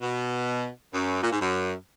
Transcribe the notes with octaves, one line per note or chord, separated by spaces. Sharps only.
B2
F#2
A#2
G#2
F#2